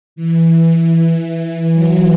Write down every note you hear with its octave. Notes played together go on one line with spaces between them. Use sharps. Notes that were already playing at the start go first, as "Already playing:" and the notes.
E3
E3
F#3